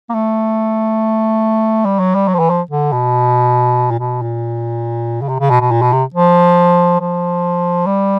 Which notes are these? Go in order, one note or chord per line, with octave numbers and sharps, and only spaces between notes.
A#3
A3
G3
F#3
G3
F#3
F3
E3
F3
D3
B2
A#2
B2
A#2
C#3
C3
C#3
B2
B2
A#2
B2
C3
F3
F3
G3